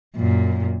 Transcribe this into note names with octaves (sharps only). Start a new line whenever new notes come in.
F#2 A#2